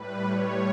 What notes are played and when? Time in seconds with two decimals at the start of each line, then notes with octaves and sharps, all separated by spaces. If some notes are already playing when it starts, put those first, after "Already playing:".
Already playing: A2 G3 B4
0.24 A2 G3 C#5